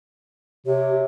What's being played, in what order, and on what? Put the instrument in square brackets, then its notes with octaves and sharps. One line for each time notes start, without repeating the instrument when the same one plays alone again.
[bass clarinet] C3 [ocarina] G4 [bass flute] C#5